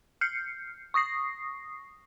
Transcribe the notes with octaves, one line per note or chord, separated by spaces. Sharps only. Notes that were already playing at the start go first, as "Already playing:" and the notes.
F6 G6 C7 C#7
C#6 D#6 A#6 C7